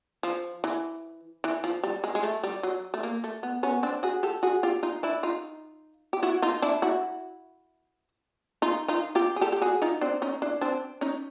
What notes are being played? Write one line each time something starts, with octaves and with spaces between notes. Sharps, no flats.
F3
E3
E3
F3
G3
G#3
G#3
A3
G3
F#3
A3
A#3
A3
B3
B3 C#4
C4 D4
F#4 G#4
G4 A4
F#4 G#4
F4 G4
D#4 F4
D4 E4
D#4 F4
G4
E4 F#4
D#4 F4
D4 E4
E4 F#4
D#4 F4
D#4 F4
F4 G4
G#4
G4 A4
G4
F#4 G#4
D#4 F4
C4 D4
C#4 D#4
D4 E4
C4 D4
C#4 D#4